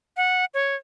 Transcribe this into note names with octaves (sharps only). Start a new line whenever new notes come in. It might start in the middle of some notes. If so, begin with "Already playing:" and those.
F#5
C#5